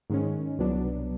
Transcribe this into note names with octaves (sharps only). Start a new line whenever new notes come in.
G#2 D#3 G#3 C#4
C2 B2 F#3 B3 D4